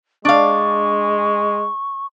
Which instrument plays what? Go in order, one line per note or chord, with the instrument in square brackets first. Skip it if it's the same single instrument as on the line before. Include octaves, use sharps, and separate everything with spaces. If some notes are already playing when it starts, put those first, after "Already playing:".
[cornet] G#3 [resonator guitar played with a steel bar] D4 F5 [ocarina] C#6